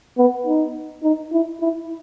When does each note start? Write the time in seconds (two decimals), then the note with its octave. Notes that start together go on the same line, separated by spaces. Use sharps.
0.18 B3
0.47 D#4
1.04 D#4
1.32 E4
1.61 E4